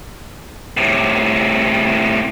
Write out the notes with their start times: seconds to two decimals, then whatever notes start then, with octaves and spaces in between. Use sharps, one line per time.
0.77 A2 C3